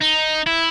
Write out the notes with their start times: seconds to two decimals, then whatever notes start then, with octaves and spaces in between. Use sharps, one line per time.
0.01 D#4
0.46 E4